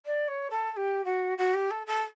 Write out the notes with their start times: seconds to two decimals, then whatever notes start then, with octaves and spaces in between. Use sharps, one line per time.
0.05 D5
0.27 C#5
0.50 A4
0.71 A4
0.76 G4
1.05 F#4
1.37 F#4
1.53 G4
1.70 A4
1.86 A4